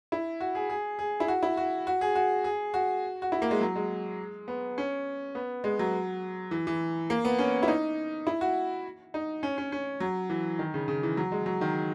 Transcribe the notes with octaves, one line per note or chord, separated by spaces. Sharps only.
E4
F#4
G#4
G#4
G#4
E4
F#4
E4
F#4
F#4
G#4
F#4
G#4
F#4
F#4
E4
A#3
G#3
F#3
G#3
B3
C#4
B3
G#3
F#3
E3
E3
A#3
B3
C#4
E4
D#4
E4
F#4
D#4
C#4
C#4
C#4
F#3
E3
D#3
C#3
C#3
E3
F#3
G#3
F#3
D#3